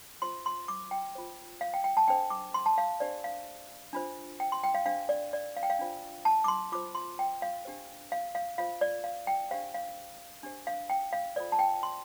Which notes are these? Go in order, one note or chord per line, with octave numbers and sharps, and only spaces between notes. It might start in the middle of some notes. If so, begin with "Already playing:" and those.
F4 C5 C6
C6
D6
G5
F4 C5
F5
G5
G5
A5
D4 A4 C5 G5
D6
C6
A5
F5
D4 G4 C5 D5
F5
D4 F4 C5
G5
C6
G5
F5
D4 G4 C5 F5
D5
D5
F5
G5
F5
D4 F4 C5
A5
D6
C6
F4 C5 D6
C6
G5
F5
D4 G4 C5
F5
F5
F4 C5 F5
D5
F5
G5
D4 G4 C5 F5
F5
D4 G4 C5
F5
G5
F5
F4 A4 C5 D5
A5
G5
C6